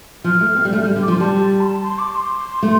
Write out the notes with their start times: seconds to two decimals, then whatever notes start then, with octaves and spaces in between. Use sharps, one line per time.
0.24 F3 F6
0.41 A3
0.56 C4
0.65 G3
0.73 A3
0.84 G3
0.96 D3
1.03 D6
1.08 F3
1.12 C6
1.20 G3 A5
1.61 C6
1.67 A5
1.84 C6
1.99 D6
2.15 C6
2.63 A3